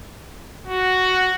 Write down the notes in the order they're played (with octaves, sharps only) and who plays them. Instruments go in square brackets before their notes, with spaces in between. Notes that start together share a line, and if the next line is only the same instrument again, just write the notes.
[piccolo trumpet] F#4